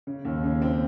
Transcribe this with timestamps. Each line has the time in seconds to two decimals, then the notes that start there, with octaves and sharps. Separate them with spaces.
0.07 C#3
0.25 D#2
0.44 C#3
0.62 C4